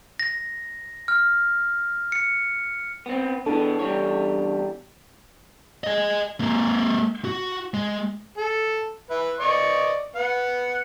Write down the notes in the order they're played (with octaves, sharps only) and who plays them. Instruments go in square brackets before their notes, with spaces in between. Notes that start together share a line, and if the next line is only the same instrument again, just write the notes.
[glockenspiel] A#6
F6
C#7
[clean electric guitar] B3 C4
[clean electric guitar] B2 E3 B3 [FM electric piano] D4 A4 A5
[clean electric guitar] E2 G3 C#5
[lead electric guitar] G#4 D#5
G#3 A#3
F#4
G#3
[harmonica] A4
B4 E5
D5 D#5 C#6
B3 F#5